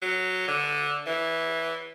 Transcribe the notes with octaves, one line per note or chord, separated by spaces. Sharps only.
F#3
D3
E3